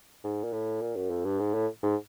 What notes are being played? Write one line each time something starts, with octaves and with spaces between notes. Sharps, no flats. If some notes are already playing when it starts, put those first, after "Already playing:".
G#2
A#2
A2
A#2
F#2
F2
G2
G#2
A2
G#2